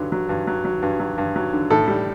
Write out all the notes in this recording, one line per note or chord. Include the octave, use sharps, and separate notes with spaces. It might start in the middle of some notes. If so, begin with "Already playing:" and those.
Already playing: G2 D3 F#3
F#3
G2
F#3
F#3
G2
F#3
G2
F#3
D3
A2 A4
G3